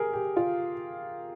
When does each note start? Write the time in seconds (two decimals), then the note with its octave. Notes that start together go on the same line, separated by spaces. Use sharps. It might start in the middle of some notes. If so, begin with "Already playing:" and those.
Already playing: G#4 A#4
0.13 G4
0.37 F4